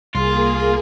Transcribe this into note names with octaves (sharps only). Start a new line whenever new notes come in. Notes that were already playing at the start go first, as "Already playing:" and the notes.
C2 A#3 F4 G#4